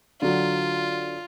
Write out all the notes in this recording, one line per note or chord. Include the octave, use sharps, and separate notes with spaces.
D3 F#3 F4